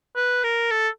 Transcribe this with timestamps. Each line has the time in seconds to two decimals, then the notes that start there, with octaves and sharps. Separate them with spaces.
0.16 B4
0.44 A#4
0.71 A4